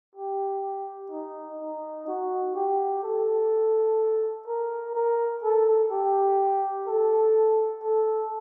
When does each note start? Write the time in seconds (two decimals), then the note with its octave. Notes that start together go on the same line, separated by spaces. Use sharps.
0.16 G4
1.11 D#4
1.60 D#4
2.08 F#4
2.55 G4
3.03 A4
4.47 A#4
4.95 A#4
5.43 A4
5.91 G4
6.87 A4
7.84 A4